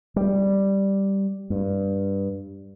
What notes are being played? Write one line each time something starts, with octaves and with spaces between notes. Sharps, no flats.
G3
G2